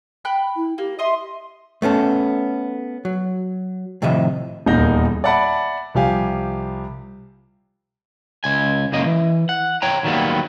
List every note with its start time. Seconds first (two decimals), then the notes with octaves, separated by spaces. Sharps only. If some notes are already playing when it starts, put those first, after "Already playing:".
0.25 G5 B5 F#6
0.56 E4
0.78 A#3 G4
0.99 D#5 E5 C6 D#6
1.82 A3 B3 C#4 A4
3.05 F#3
4.02 A2 C3 D#3 F3 D#5 E5
4.66 D#1 E2 A#3 D#4 G6 A#6
5.24 D5 E5 F#5 A5 B5
5.94 C2 F3 G4 F5 G#5
8.44 C#2 G#5
8.93 C#2 F#2 A#3 D#5
9.06 E3
9.49 F#5
9.82 C#5 G5 A#5
10.04 D#3 F#3 G3 A#3 B3